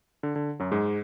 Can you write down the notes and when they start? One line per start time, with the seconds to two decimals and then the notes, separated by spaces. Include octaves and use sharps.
0.23 D3
0.36 D3
0.60 F#2 F#3
0.71 G#2 G#3